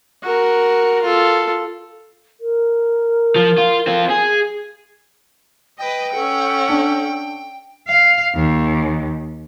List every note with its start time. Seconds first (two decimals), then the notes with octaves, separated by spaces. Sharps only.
0.23 F#4 A#4
1.02 F4 A4
2.40 A#4
3.36 F3
3.58 F4
3.87 C4 F4
4.10 G#4
5.79 B4 D#5 G5
6.13 C#4 A4 F#5
6.69 D4
7.88 F5
8.35 D#2